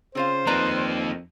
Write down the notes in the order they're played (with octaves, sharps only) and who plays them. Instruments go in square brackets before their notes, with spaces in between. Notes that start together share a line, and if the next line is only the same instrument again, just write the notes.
[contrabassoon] C#3 [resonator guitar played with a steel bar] C4 F4 F5 [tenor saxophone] C5
[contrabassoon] F2 [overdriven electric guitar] A#3 D#4 [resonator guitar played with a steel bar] B4 D5 A#5